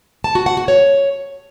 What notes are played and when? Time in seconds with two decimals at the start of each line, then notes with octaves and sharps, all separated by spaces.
0.24 A5
0.35 F#4
0.46 F#5
0.57 F#4
0.68 C#5